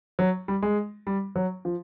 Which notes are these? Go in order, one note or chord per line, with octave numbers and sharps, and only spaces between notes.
F#3
G3
G#3
G3
F#3
F3